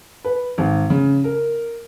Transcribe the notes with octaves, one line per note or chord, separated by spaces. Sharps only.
B4
G#1
C#3
A#4